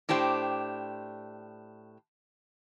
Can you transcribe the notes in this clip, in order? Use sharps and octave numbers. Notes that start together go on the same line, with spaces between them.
A2 D4 G4 C5 G5